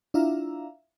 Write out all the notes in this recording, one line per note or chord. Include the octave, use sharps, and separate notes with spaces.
D4 E4 F4 E5 F5 A#5